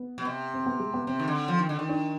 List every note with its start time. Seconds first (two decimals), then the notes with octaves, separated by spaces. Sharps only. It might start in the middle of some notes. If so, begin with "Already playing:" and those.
Already playing: B3
0.18 B2
0.25 C3
0.54 C4
0.66 B3
0.80 G#3
0.94 B3
1.07 C3 C4
1.20 D#3
1.28 D3
1.48 F3
1.59 D#3
1.69 D3
1.79 D#3
1.89 D4